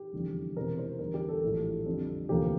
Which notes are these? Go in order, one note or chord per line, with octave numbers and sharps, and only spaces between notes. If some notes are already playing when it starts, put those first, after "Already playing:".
Already playing: G4
F1 E2 D3 G3
E1 E2 C3 E3 A#4
C5
E2 D3 G3 A#4
G4
A4
A#1 A2 E3 G3
F2 D3 G3
E1 D2 C3 F3 A#3 G4